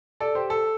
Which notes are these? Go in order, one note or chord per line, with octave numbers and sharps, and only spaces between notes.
A4 D5
G4 C5
A4